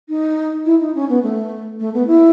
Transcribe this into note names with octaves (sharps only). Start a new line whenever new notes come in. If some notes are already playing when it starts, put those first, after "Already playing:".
D#4
E4
D#4
C#4
B3
A3
A3
B3
E4